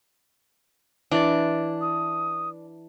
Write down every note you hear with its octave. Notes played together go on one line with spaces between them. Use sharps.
E3 D4 D5
D#6